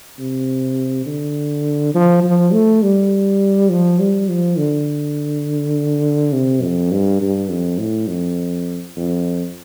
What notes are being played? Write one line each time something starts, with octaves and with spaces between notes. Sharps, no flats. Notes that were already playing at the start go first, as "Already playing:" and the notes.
C3
D3
F3
F3
A3
G3
F3
G3
F3
D3
C3
F2
G2
G2
F2
A2
F2
F2